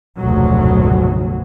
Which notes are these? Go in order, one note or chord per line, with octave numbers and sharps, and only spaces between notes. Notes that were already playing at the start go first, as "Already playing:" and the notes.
F1 D2 G#2 B2 F#3